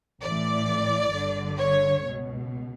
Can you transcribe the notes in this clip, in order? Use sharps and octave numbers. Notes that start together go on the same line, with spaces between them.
A1 A2 E3 D5
G1 G2 D3
C#5
C#2 B2